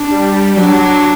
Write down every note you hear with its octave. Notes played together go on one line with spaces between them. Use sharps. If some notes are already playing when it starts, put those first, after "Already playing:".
Already playing: D4
G3
F#3 D4